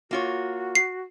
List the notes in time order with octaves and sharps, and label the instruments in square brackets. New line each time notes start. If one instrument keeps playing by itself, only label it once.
[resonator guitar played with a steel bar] A#3 F4 C#5 [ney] F#4
[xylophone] C7